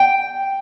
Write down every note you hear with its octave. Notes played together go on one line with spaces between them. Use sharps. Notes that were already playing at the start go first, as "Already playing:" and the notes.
Already playing: G5